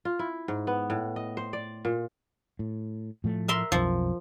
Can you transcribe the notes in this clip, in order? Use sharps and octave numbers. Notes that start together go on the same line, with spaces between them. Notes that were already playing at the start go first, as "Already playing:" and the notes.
F4
E4
G#2
B3
A2
D#5
C5
D5
A#2
A2
A2 F3 A3
A#4 E5 C6
B1 F2 F3